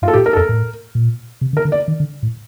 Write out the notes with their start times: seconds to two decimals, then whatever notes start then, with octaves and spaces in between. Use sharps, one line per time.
0.02 G2 F4
0.08 A4
0.14 A2 G4
0.26 A#4
0.33 A4
0.36 F2 A#4
0.49 A2
0.95 A#2
1.41 C3
1.53 D3
1.57 A#4
1.65 D3
1.72 D5
1.88 D#3
2.00 D3
2.23 A2